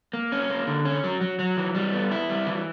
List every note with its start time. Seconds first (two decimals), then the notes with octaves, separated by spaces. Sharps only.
0.13 A#3
0.32 C#4
0.50 A#3
0.67 D3
0.85 C#4
1.04 F#3
1.21 F#3
1.39 F#3
1.57 E3
1.75 G3
1.93 B3
2.11 E4
2.30 G3
2.47 E3